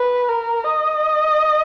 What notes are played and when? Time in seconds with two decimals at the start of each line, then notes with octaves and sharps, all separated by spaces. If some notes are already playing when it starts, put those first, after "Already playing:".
Already playing: B4
0.29 A#4
0.64 D#5